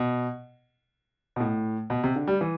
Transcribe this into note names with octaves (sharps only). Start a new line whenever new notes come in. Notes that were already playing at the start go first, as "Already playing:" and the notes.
Already playing: B2
B2
A2
B2
C3
D3
G3
E3